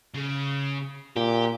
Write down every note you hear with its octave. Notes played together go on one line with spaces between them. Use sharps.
C#3
A#2 G4